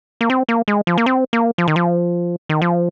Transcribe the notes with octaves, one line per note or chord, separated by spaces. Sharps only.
A#3
C4
A#3
G#3
F3
A#3
C4
A#3
F3
D#3
F3
D#3
F3